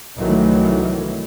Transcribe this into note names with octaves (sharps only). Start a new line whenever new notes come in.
C2 D#3 E3 F#3 A3